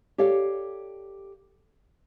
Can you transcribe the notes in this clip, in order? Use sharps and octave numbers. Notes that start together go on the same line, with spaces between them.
G4 A4 C#5 D5 F5